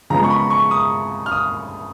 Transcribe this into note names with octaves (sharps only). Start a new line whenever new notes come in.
C#3 F3 G#3 B3 A#5
C#6
B5
C#6
D#6
F6
D#6